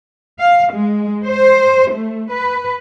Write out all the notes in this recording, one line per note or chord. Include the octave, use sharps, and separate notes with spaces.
F5
G#3
C5
A3
B4